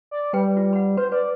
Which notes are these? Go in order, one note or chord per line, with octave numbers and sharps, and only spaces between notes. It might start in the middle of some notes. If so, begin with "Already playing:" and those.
D5
G3 B4 G5
F4
F#5 B5
B4 C5
B4 D5